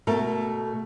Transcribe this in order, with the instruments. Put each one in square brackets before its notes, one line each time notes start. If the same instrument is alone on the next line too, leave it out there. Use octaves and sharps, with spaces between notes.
[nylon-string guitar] B2 A3 A4 A#4